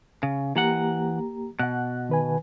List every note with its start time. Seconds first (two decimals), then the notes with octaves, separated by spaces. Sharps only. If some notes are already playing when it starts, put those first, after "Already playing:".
0.23 C#3
0.56 E3 A#3 G4 F#5 A#5
1.59 B2 F#5 F#6
2.09 D#3 B4 G#5